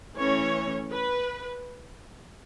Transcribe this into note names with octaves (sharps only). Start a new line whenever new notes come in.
E3 A3 C#4 C#5
B4